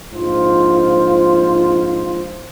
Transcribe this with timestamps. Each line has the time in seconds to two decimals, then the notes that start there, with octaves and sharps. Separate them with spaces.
0.13 A#1 G#2 F4 C5